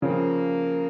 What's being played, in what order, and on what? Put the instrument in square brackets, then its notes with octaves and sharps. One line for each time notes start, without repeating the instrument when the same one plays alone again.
[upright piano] C#3 F3 C4 [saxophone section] A#3